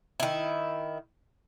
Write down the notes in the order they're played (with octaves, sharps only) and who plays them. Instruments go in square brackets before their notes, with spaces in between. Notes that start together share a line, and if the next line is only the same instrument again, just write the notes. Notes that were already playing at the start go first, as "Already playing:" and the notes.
[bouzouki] D#3 E4